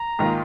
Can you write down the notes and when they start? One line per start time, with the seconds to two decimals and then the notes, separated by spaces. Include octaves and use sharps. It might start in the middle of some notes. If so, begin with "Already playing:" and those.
Already playing: A#5
0.19 G#2 D#3 A#3 F4